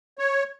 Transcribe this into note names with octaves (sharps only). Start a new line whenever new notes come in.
C#5